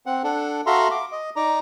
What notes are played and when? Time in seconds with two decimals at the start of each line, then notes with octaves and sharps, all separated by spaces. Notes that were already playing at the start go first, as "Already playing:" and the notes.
0.06 C4 F#5
0.24 D4 A4 F#5
0.66 F#4 A4 E5 F5 A#5 C6
0.91 D6
1.12 D#5
1.36 D#4 D5 A#5